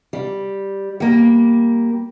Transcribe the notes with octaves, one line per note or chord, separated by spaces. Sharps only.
G3
G3 A#3